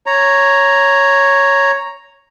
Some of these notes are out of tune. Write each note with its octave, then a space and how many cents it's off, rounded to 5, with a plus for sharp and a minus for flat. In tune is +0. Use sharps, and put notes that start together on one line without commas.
C#5 +0 A#5 +0